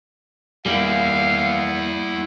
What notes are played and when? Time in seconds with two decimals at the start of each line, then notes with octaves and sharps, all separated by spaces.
0.66 G3 A#3 E4 G#4 F5